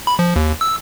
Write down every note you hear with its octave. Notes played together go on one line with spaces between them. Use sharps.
B5
F3
D#2
E6